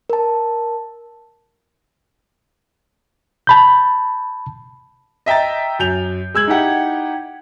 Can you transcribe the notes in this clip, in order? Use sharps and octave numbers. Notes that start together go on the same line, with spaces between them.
A#4 A5
A5 B5 G6
D#5 E5 G5 A#5 A6
F#2 G6 F7
G#3 E6 G#6 F#7
D#4 E4 G4 F#5